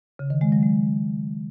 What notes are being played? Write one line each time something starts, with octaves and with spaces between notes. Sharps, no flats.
C#3
D#3
G#3
F#3
G#3